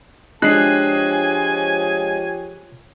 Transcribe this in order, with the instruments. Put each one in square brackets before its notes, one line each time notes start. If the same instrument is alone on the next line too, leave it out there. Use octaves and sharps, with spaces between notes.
[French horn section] F3 G4 C#5 [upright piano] G#3 D4 [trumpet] G#5 [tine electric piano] F#6 C7